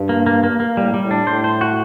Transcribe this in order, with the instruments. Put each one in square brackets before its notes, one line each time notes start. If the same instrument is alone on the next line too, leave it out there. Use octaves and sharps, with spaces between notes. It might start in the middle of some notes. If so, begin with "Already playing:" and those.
Already playing: [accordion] G2
[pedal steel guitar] A#3
A#3
A#3
A#3
[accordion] A2 [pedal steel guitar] G3
[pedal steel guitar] G3
[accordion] A2
[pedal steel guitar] D4
[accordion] A2 [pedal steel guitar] C5
[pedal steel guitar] C5
F#4